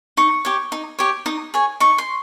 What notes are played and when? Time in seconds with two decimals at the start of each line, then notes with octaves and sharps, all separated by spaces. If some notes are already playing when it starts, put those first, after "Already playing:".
0.17 D#4 C#6
0.45 G4 C#5
0.72 D#4
0.99 G4 C#5
1.26 D#4 D#6
1.54 G#4 C#5
1.80 D#4 C#6
1.98 C6